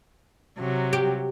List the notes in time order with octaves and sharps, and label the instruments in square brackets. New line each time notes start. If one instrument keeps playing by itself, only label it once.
[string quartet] C3 F#3
[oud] G4